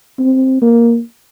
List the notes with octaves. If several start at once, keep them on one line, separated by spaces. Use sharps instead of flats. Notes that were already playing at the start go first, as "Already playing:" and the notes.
C4
A#3